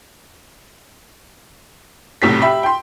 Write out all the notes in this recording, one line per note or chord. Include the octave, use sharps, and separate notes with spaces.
F1 B1 A2 C3 B6
G4 E5 B5
G5 C6